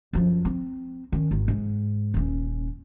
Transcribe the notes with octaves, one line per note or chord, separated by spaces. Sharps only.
F#2 F3
C4
D#3 C#4
G#1 D#3
G#2
D#1 C#4